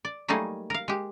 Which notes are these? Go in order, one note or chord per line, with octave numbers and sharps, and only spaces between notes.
D5
F#3 G3 A3 A#3 D#4 G#4
A#4 F5
G#3 G4